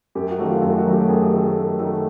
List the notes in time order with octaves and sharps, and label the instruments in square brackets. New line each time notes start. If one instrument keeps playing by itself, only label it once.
[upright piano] F#2 G4
F#4
D#3 F#3 A3
F4
F#2 F#4
F#4
D#3 F#3 A3
G4
F#2 G#4
D#3 F#3 A3
F#2
D#3 F#3 A3